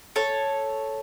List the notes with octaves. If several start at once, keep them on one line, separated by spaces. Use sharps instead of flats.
A4 C#5